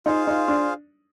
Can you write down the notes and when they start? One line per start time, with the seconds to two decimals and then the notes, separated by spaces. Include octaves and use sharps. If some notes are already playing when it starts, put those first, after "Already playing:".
0.06 D#4 F4 G#4 C5 F5
0.27 D#4
0.48 D4